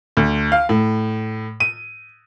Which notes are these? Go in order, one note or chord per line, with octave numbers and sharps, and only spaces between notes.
D2
F5
A2
D#7